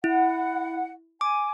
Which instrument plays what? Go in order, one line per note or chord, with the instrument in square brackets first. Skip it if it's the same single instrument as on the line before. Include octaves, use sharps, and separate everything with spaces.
[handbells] E4 [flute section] F#5
[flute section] G#5 [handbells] D6